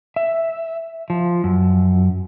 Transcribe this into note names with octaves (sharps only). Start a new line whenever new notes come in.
E5
F3
F#2